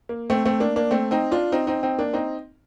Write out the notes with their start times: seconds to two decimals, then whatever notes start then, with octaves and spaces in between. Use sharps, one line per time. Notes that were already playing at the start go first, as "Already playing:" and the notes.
0.09 A#3
0.30 A3 C4
0.45 A3 C4
0.60 A#3 D4
0.76 A#3 D4
0.91 A3 C4
1.11 C4 D#4
1.31 D4 F4
1.52 C4 D#4
1.67 C4 D#4
1.83 C4 D#4
1.99 A#3 D4
2.13 C4 D#4